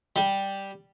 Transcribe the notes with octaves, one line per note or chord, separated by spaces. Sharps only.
G3